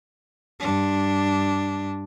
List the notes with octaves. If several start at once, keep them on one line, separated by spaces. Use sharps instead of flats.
G2 D4